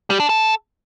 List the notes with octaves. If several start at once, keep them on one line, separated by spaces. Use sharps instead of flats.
G3
D4
A4